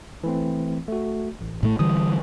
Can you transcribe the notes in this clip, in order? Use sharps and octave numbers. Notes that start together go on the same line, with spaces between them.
E3 A3 C4
A3 F#4
A1
A2 A3
D3 E3 G3 D#6